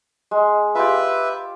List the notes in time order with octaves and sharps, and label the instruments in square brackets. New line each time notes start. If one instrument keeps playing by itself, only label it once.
[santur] G#3
[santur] F4 G4 [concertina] B4 E5